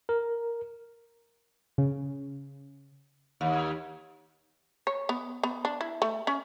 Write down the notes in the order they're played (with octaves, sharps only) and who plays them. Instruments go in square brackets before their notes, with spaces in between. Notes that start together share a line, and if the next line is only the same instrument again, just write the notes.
[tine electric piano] A#4
[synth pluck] C#3
[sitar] D#2
[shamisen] C#5
B3
B3
D4
E4
A3
C#4